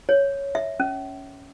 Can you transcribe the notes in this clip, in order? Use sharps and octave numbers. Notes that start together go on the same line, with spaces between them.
C#5
E5
C#4